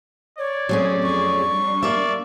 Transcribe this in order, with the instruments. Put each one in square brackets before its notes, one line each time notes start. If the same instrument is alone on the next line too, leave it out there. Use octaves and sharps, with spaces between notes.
[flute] C#5 [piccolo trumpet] D5
[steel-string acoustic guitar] F#3 A3 C#4 [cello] C4 G#4
[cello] F2 G#4 [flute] C#6
[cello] G3 D4
[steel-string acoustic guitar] A#3 E5 [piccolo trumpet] D5